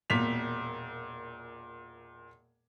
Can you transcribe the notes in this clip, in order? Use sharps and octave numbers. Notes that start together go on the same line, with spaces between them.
E1 A#2 B6 F7